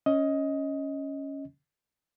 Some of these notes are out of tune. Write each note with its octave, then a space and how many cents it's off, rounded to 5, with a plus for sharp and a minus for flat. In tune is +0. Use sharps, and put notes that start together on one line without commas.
C#4 +0 D#5 +15